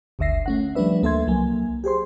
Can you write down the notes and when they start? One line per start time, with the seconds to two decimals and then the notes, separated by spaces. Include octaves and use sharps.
0.19 G1 D2 D3 E5 A#6 C7
0.46 A3 C#4 F#5
0.75 F3 G3 A3 D4 B4 E5
1.03 D2 A#3 A4 E5 C6 G#6
1.27 C2 F#3 A#3 G#5
1.84 G4 G#4 C5 C6